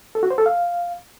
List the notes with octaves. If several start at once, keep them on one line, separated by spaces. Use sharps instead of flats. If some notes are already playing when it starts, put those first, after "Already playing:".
A4
F#4
C5
A4
F5